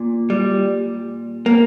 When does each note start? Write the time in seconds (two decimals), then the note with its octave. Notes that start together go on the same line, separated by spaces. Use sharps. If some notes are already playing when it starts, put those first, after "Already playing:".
Already playing: A#2
0.30 G3
1.46 A#3